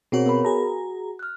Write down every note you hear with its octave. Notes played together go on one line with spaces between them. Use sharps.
B2 C4 F#4 G#4 A#4 C#5
B3 A#4 B5
F#4 G#4 A#5
F6 F#6